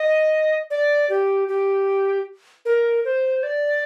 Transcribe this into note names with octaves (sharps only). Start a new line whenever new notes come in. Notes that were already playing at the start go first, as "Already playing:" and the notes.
Already playing: D#5
D5
G4
G4
A#4
C5
D5